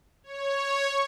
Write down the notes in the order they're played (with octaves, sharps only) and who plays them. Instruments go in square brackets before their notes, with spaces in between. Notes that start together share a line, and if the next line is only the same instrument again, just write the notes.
[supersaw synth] C#5